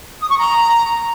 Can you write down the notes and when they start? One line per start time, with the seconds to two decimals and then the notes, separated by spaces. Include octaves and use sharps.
0.21 D#6
0.30 C#6
0.39 A#5